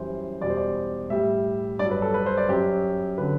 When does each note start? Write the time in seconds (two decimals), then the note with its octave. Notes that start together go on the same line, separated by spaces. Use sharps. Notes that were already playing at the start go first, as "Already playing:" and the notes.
Already playing: F#2 E3 G3 C5
0.41 E2 B2 G3 D5
0.50 C5
0.57 D5
1.10 A2 G3 E5
1.79 G2 D5
1.84 F#3
1.91 B4
2.02 A4
2.14 B4
2.26 C5
2.37 D5
2.49 F#2 F#3 G4
3.18 D3 F#3 B4